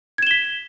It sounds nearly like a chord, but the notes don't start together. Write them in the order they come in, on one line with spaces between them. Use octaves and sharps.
G#6 E7 G7 B6